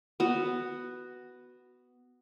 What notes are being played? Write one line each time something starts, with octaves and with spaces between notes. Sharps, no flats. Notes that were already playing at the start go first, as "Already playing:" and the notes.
B3 F#4